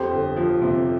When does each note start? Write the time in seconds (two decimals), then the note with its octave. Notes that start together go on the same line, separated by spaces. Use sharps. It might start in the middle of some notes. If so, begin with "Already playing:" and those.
Already playing: F2 G4 C5
0.11 G1
0.36 F3
0.62 C3